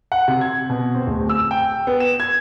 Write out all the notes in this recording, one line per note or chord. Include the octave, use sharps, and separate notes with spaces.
F#5
C3
G#6
B2
C4
D1
E6
G5
B3
E7
G#6